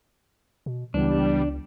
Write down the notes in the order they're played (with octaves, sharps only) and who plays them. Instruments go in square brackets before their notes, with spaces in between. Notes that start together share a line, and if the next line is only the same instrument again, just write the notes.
[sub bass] B2
[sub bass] C#2 [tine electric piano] C#3 E3 B3 [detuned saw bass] G3 [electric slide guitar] D4